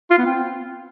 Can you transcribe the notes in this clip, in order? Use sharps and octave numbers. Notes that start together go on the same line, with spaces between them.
F4
B3
C4